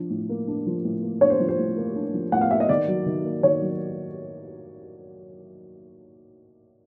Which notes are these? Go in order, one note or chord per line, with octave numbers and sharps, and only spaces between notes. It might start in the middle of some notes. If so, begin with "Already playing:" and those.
Already playing: F3 D4
A2
A#3
D4
F3
A2
A#3
D4 C#5
C5
F3
C5
A2
A#3
D4
F3
A2 F#5
F5
A#3 E5
D#5
D#3 D5
F#3
D#3
A#3
D#3 C#5
F#3